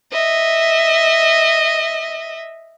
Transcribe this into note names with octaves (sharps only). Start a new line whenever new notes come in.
D#5 E5